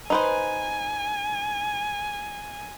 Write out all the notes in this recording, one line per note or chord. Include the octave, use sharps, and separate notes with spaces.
D#4 B4 C5 G#5